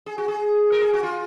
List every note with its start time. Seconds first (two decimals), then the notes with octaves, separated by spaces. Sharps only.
0.06 G#4
0.18 F#4
0.28 G#4
0.72 A#4
0.82 G#4
0.93 F#4
1.03 F4